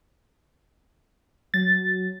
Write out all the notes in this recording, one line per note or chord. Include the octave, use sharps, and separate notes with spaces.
F#3 A6